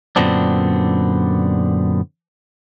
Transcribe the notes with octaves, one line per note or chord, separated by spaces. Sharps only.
F#2 A#2 D3 B3 C4 D4